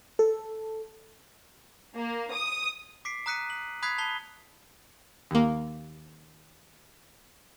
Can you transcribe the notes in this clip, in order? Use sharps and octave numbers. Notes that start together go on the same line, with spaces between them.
A4
A#3
D#6
D6 B6 C7 D7
A#5 D#6 F#6 B6 C#7 D#7
F#7
B5 D#6 F#6 G#6 B6 C7
A5 B5 G6 C7 G7
D#2 A#3